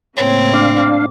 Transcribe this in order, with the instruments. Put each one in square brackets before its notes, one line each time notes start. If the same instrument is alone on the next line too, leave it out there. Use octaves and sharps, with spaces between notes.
[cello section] A2 C#3 A#3 [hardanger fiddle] C4 [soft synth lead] C#5
[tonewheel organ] D4 F5 [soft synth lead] D6